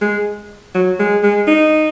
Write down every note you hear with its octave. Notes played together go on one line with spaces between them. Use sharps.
G#3
F#3
G#3
G#3
D#4